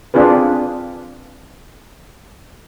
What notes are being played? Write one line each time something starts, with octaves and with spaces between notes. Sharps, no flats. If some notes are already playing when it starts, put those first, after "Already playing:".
C4 D4 F4 G#4 B4